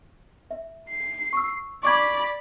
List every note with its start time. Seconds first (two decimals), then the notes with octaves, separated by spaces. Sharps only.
0.51 E5
0.90 C7
1.33 C#6 E6
1.83 D5 B5 C#6 D6 G#6